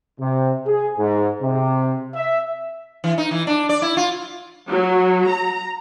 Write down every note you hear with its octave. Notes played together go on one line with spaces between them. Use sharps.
C3
G#4
G#2
C3
E5
E3
D#4
E3
D4
D5
E4
F4
F#3
A#5